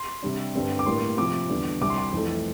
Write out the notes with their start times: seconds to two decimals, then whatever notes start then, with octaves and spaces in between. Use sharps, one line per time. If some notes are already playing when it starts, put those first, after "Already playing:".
Already playing: C6
0.23 C3 G3 D4
0.55 G2 D3 G3 C4
0.79 D6
0.86 A2 G3 A#3 D4 C6
1.18 C3 F3 C4 D6
1.49 E2 D3 G3 D4
1.81 C2 C3 G3 D6
1.90 C6
1.98 D6
2.12 F2 E3 A3